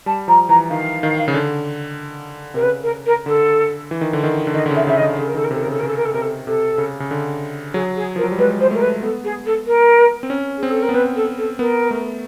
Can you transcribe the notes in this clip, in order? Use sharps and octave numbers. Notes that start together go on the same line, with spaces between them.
G3 A5
F3 A#5
E3 A#5
D#3 F5
D#3
C#3
D3
C3 A#4
C#3 B4
A#4
A#4
D3 A4
E3
D#3
D3
D#3
D3
D#3 D#5
D3
C#3 E5
C#3 E5
D#5
D3
C#3 A4
A#4
D#3 A4
A#4
C3 A4
A#4
C#3 A4
A#4
C#3 A4
A#4
A4
C3 A#4
A4
C3 A4
C#3
C#3
D3
F#3 G#4
G#4
F3 A#4
F#3
G3
G#3 B4
C5
A3 A#4
B4
B3 A4
G#4
A4
A#4
C4
C#4
G#4
C4
A4
A#4
B3
C4 B4
A4
A4
B3 A#4
A3